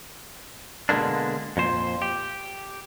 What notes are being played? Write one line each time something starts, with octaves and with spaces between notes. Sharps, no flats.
B2 D3 G#3 A#3 D4
F2 A#2 C5
G4